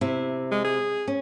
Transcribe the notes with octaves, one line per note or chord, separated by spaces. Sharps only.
C3 E4
G#3
G#4
C#4